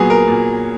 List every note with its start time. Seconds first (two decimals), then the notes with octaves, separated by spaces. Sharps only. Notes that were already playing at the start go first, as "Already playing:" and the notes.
Already playing: A#2 F#3 B3 G#4
0.10 A#4
0.28 A#2